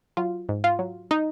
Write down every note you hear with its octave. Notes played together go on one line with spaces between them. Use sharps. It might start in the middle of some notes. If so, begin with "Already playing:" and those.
F#3 F4
G#2
F4
F#3
D#4